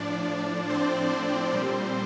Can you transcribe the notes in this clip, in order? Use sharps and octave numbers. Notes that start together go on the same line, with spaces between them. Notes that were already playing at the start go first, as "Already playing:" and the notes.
Already playing: A2 F3 D4 D5
C4 C5
C4 C5
A#2 G3